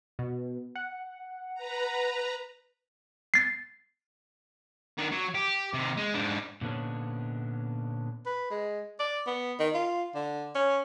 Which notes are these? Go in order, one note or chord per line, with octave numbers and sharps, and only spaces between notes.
B2
F#5
B4 A#5
A6 C7
D#3 D4
F#3
G4
C3 D#3
G#3
G#2 D4
A#2 D3 B3 C#4 D4
B4
G#3
D5
B3
D#3
F4
D3
C#4